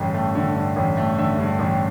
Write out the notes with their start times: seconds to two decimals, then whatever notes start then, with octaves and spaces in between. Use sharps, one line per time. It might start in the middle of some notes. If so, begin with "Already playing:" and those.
Already playing: A1 G2 D3
0.14 A3
0.35 D3
0.56 G2
0.76 A1
0.97 A3
1.18 D3 E5
1.38 G2
1.59 A1